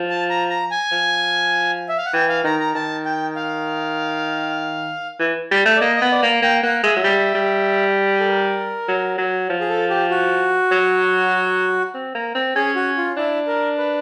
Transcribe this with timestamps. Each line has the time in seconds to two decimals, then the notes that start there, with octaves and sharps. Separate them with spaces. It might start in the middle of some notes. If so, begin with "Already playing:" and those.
Already playing: F3
0.10 A5
0.30 A#5
0.50 A#5
0.71 G#5
0.92 F3
1.89 E5
1.98 F5
2.06 F#5
2.13 E3 G5
2.29 F5
2.44 D#3 A#5
2.59 A#5
2.75 D#3 A5
3.05 G5
3.36 F5
5.20 E3
5.51 G3
5.66 A3
5.76 D5
5.81 A#3 D#5
5.96 D#5
6.02 B3
6.12 D5
6.23 A#3
6.42 A#3 G5
6.63 A#3 F#5
6.83 G#3 E5
6.96 F#3
7.04 G3
7.35 G3
8.20 A4
8.27 A#4
8.88 F#3
9.18 F#3
9.50 F3
9.61 G#4
9.70 A4
9.90 G4
10.11 F#4
10.71 F#3
11.94 C4
12.15 A#3
12.35 C4
12.56 C#4 G#4
12.75 F#4
12.97 F4
13.17 D4 E4
13.47 A#4
13.78 B4